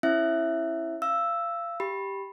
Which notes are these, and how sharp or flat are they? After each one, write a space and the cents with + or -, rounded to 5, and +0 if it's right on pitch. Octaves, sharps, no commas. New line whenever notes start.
C#4 -40 E4 +0 E5 +5
F5 -30 E6 +0
G4 +0 B5 +0